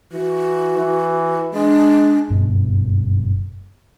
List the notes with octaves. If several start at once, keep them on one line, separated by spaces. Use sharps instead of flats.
E3 F#4
E3
G#3 D4
F#1 G2 B2